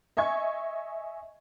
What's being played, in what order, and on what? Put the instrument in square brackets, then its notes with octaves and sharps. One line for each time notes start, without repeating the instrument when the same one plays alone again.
[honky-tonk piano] D#5 E5 G#5 C#6 G#6